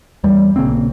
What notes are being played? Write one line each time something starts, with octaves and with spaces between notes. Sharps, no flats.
E2 G3
A#1 C#3 A#3 C4